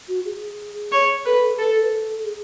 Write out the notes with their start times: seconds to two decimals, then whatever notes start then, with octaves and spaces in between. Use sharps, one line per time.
0.09 F#4
0.25 G#4
0.92 C#5
1.25 A4 B4
1.42 A4
1.58 A4 B4
1.75 A4
1.82 B4
1.90 A4
2.25 G#4